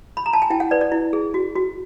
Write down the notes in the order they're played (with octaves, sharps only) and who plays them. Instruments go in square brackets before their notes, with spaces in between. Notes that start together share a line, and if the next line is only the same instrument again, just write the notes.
[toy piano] B5
A#5
A5
G#5
E4 G5
F#5
B4 D5
D5
E4
G#4
F#4
F#4